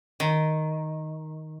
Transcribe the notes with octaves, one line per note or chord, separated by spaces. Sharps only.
D#3